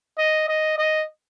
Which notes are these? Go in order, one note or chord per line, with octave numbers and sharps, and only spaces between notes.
D#5
D#5
D#5